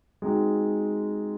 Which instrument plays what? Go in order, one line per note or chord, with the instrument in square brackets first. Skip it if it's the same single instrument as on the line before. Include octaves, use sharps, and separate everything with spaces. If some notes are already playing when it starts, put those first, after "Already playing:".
[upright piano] G#3 C4 D#4 F#4